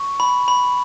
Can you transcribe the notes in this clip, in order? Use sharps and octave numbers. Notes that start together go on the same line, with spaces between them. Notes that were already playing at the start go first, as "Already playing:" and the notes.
Already playing: C#6
B5
B5